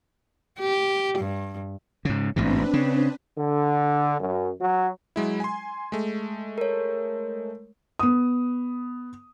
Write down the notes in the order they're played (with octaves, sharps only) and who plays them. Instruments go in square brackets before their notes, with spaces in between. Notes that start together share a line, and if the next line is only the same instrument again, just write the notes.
[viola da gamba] G4
G2
[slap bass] G#2 C#3
[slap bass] A1 G#2 B2 [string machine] C4 D4 B4
[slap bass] C#3
[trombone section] D3
F#2
F#3
[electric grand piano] F#3 G#3 E4
G#5 C6
G#3 A3
[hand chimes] A#4 C#5
[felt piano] B3 D#6